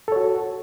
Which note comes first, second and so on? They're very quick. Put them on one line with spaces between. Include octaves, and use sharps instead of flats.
A4 C#5 F#4